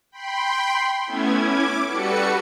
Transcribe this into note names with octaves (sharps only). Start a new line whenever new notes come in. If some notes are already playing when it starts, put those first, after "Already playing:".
G5 B5 C6
A3 B3 C#4 E4 G#6
D6
G3 F#4 A4 B4 C#7